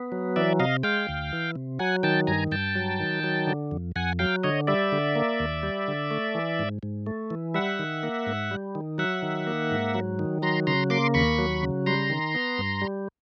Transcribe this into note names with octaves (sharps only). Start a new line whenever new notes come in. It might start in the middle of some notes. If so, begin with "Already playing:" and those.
Already playing: B3
F#3
E3 D5 E5
C3 D#5 F5
G#3 F5 G5
D2
E3
C3
F#3 F#5 G#5
D#3 G5 A5
G2 G#5 A#5
G2 G5 A5
F#3
D#3
F#3
D3
F2
F2 F#5 G#5
F#3 F5 G5
D3 C#5 D#5
G3 D5 E5
D3
A#3
D#2
G3
D3
A3
E3
G#2
G#2
A3
E3
G3 E5 F#5
D#3
A#3
G#2
G3
D#3
F#3 E5 F#5
D#3
A#3
G#2
F#3
D#3
F#3 A#5 C6
C#3 A#5 C6
A#3 C6 D6
D#2 B5 C#6
F#3
C#3
G3 A#5 C6
D#3
B3
G2
G3